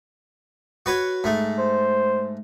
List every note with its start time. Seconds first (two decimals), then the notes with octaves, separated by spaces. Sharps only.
0.86 F#4 B4 C#5
1.24 G#2 A3
1.59 C5